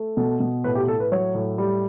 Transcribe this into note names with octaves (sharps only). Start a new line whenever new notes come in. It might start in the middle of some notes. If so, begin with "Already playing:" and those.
Already playing: A3
B2 A4
B2
A2 B4
G4
A2 A4
B4
F#3 C#5
A2
G3